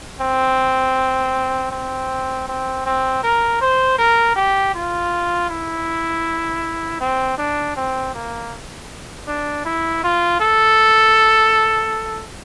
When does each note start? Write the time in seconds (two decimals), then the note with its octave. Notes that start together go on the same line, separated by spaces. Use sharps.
0.21 C4
1.72 C4
2.48 C4
2.86 C4
3.23 A#4
3.61 C5
3.98 A#4
4.36 G4
4.75 F4
5.49 E4
7.01 C4
7.38 D4
7.76 C4
8.14 A#3
9.27 D4
9.65 E4
10.04 F4
10.40 A4